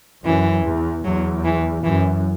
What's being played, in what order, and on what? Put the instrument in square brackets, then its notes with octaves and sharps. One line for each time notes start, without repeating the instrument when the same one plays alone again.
[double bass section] F#2 [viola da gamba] E3
[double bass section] E2
[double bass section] E2 [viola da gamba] F#3
[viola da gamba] E3
[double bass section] F#2 [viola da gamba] E3